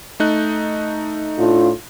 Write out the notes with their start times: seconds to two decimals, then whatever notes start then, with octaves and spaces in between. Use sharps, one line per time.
0.20 A3 D#4 F#6
1.38 A2 D4 F4